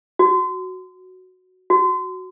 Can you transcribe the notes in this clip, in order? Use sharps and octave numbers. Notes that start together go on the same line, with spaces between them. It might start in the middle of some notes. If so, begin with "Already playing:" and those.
F#4
F#4